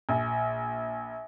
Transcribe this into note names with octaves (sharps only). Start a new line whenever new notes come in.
A#1